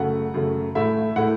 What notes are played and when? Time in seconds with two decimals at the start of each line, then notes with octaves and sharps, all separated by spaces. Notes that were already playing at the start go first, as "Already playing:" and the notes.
Already playing: F#2 C#3 A3 F#5
0.34 F#2 C#3 A3
0.75 A2 A3 E4 E5
1.16 A2 A3 E4 F#5